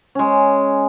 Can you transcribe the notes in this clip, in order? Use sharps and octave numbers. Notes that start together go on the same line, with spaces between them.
G#3 C#4